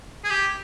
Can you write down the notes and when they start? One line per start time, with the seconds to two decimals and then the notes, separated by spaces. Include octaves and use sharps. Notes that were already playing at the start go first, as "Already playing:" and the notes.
0.25 G#4
0.30 G4